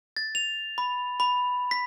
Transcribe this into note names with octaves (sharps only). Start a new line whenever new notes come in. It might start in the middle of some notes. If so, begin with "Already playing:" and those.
A6
F7
B5
B5
B6